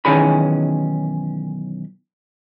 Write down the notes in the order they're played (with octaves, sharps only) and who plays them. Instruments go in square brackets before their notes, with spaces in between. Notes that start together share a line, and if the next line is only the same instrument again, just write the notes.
[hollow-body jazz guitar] B1 D#3 E3 C#4 G#4 B5